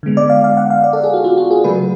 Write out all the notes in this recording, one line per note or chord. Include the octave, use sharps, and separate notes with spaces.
D3 G#3 B3
D5
F5
F5
F#5
F5
D5
A4
G#4
F#4
F4
F#4
G#4
C#3 F#3 A3 B4